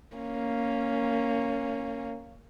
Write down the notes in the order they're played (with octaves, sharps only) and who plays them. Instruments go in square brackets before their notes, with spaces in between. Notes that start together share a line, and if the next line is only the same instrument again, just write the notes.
[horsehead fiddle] A#3 C#4